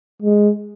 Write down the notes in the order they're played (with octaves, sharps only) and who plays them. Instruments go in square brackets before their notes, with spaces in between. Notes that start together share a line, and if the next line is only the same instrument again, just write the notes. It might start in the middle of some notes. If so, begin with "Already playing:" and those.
[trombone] G#3